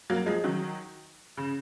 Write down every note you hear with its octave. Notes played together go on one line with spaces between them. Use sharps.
F#3 A#3
F3 G#3
D#3 F#3
C#3